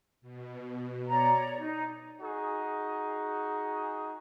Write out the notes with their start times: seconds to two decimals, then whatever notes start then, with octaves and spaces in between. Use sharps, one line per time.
0.21 B2
1.07 C#5 D5 A#5
1.60 D#4
2.21 D#4 F#4 G#4